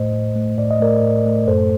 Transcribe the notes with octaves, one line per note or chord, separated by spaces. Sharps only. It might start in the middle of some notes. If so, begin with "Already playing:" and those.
Already playing: A2 A3 C5 D#5
A2
A3
A2 D5
D#5
A3 A#4 D5
A2
A3
F#2 A4 C5